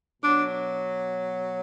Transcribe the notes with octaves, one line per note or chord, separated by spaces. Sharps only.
B2 F#3 D4